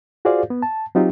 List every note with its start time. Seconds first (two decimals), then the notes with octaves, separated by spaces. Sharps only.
0.25 F4 F#4 G#4 C5 D5 F5
0.50 B3
0.62 A5
0.95 F#3 C4 D#4 F4 G4